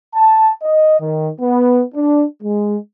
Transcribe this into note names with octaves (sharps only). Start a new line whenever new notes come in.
A5
D#5
D#3
B3
D4
G#3